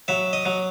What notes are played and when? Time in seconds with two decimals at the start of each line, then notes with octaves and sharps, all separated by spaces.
0.08 F#3 E5
0.33 D#5
0.46 F#3